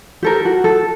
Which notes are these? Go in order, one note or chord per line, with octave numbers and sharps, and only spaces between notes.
G4 A4 A#4
F#4
A4